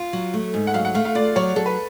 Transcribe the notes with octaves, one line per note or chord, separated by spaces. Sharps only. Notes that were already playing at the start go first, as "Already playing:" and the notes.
Already playing: F4
F#3
A3
G#2
F#5
F#3 F5
F#5
A3 F5
F5
F4 D5
F#3 C#5
F#3 A4
B4